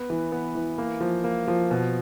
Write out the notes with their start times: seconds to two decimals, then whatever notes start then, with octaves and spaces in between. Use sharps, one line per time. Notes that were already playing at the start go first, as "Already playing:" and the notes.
Already playing: B3
0.10 E3
0.32 B3
0.55 E3
0.78 A#3
1.01 F3
1.24 A#3
1.48 F3
1.71 B2